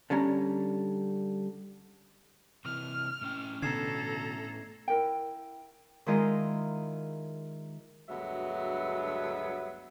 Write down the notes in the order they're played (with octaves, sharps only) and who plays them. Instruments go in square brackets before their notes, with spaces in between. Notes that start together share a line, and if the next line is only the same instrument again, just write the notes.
[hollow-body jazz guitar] D3 G3 C#4 A#5
[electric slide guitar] C3 E3 [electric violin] F6
[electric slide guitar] A2 C#4 G5
[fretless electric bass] B2 D3 [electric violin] A4 A#5 [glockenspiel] G#6 C7 E7
[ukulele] E4 A#4 G5
[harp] D#3 G#3 E4 F4 A#4 D#5
[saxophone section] D2 G2 F#3 G#3 B3 E5